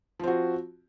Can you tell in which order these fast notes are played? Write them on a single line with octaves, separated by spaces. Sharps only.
F3 C4 F#4